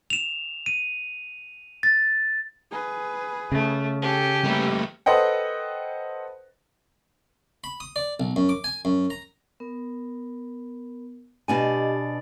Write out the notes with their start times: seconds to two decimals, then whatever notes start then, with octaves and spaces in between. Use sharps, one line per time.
0.10 E7 F7
0.66 D#7
1.83 A6
2.71 G#4 B4
3.52 C#3 A3
4.02 G4 A4 G#5
4.45 G3 A3 A#3 B4
5.06 A4 B4 C5 D#5 F#5 G5
7.64 B5
7.80 D#6
7.96 D5
8.20 B1
8.36 F#2
8.49 D6
8.64 G#5
8.85 F#2
9.10 A#5
9.60 B3 A#4
11.48 B2 D4 G4 D#5 G#5